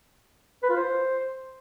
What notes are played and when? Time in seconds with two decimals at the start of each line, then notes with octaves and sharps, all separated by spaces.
0.63 B4
0.69 F4
0.76 C5